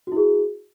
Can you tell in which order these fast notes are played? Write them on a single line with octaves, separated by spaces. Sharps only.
F#4 E4 G#4